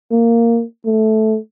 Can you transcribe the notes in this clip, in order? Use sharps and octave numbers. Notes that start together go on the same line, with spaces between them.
A#3
A3